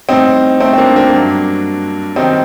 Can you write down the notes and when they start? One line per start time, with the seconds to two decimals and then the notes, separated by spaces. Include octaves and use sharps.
0.09 A2 G3 C4 D#4
0.60 A3 C4
0.73 C4
0.78 A#3 D4
0.96 A#3 D4
1.13 G2 F#3
2.16 F#2 D#3 G3 C4 D#4